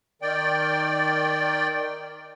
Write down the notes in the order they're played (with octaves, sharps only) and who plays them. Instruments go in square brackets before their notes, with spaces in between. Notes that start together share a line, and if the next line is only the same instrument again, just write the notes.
[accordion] D#3 D5 G5